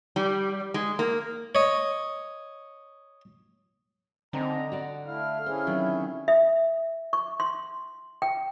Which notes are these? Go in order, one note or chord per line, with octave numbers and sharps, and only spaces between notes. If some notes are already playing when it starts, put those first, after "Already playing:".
G3
G#3
A#3
C#5 D#5
D3 D#3 C4 D#5 G#5 A#5
F#4 D5
A3 E4 F5 F6
C#4 E4 G#4 C5
C3 D#3 F#3
E5
C#6
C6
G5